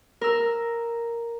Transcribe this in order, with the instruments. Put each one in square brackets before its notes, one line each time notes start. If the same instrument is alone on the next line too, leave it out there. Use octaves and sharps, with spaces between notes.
[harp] A#4 E6